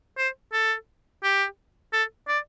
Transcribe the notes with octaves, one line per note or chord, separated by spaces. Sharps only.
C5
A4
G4
A4
D5